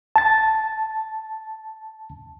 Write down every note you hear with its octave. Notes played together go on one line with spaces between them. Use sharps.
A5 A6